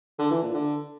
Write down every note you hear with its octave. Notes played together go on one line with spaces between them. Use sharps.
D3
E3
A#2
D3